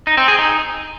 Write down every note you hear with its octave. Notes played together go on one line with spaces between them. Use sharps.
D#4
C4
G#4
D#4